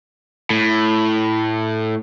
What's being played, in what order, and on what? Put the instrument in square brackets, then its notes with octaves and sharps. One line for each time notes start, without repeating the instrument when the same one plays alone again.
[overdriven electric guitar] A2